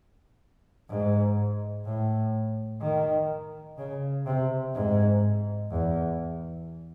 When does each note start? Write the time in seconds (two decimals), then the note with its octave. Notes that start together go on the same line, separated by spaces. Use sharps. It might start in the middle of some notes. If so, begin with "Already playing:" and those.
0.89 G#2
1.85 A2
2.81 D#3
3.77 C#3
4.26 C3
4.74 G#2
5.70 E2